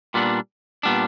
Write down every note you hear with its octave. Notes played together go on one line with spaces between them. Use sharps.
A#2 G3 B3 D4
A#2 G3 B3 D4